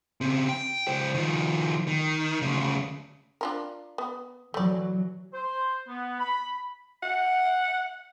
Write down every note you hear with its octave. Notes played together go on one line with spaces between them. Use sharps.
C#3 C4
G5
C#2 C5
D#3 F3
D#3
D2 C#3
D4 F4 A#4
B3
E3 F#3 A3 D5
C5
B3
B5
F#5